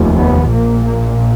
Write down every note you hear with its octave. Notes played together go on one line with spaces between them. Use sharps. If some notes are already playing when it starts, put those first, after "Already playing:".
Already playing: F1 D#2
B3
A#1 A#2 A#3
A#3